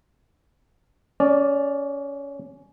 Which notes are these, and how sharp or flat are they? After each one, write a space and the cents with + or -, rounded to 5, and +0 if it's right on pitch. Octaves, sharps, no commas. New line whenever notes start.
C#4 +20 D5 +0